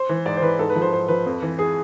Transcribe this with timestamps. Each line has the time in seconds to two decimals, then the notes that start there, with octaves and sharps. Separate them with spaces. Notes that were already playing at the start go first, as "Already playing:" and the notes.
Already playing: C5
0.09 E3
0.26 G#2 D5
0.37 C5
0.42 E3 B4
0.59 G#2 A4
0.70 B4
0.76 F3
0.82 C5
0.92 G#2 C5
1.08 F3 B4
1.26 F2
1.42 E3
1.59 G#4